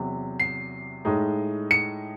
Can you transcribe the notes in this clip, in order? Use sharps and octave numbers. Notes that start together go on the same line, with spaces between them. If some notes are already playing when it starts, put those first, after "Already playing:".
Already playing: E2 C3 F#3
C7
A2 G#3 D#4
C#7